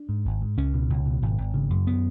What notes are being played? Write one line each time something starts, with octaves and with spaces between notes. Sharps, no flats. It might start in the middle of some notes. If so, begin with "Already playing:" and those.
Already playing: D4
G#2
G#1
G#2
C#2 C#4
B2
C#2
B2
G#1
G#1
C#3
F#2
B3